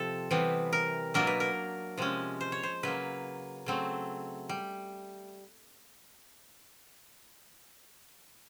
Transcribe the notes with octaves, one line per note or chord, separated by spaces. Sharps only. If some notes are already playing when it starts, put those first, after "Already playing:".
Already playing: C3 F3 C4 A4
C3 E3 G3 B3
A#4
B2 F#3 A#3 D4 A#4
B4
A#4
C3 F3 G#3 C#4
C5
C#5
C5
C#3 F#3 A#3 B4
C#3 F#3 A3 C4
G3